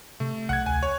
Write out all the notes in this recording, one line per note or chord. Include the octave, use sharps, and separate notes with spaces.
C3 A3
B1 F#5 F#6 G#6
D2 G#5
C#5